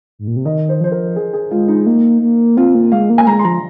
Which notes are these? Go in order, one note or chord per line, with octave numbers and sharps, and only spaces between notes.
G#2
A#2
C3
D#3 D#5
C5
F3 C5
A#4
G#4
G#4
G#3 F4
D#4
A#3
A#3
C4 F4
A#3
G#3 F5
A#3
G#5
G#3 A#5
C6
F3 A#5